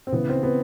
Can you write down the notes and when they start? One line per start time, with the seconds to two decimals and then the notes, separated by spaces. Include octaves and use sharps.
0.07 C4
0.12 C#3 E3 B3
0.29 C4
0.43 B3